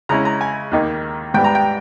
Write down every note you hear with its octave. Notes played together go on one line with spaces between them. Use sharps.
C#3 G#3 C#4 E4 A#5
A#5
G#5
D#2 D#3 A#3 D#4
G#2 G3 B3 G5
A#5
G5